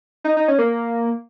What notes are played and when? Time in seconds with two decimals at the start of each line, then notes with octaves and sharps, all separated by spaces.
0.24 D#4
0.37 D#4
0.48 C#4
0.59 A#3